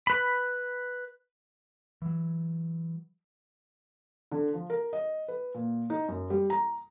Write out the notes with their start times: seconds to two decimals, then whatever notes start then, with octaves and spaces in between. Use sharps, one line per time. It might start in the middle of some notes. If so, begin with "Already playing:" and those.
0.07 B4 B5
2.02 E3 F#3
4.32 D3
4.53 F3
4.70 A#4
4.93 D#5
5.28 B4
5.54 A#2
5.90 D#4
6.08 F#2
6.30 G3
6.50 A#5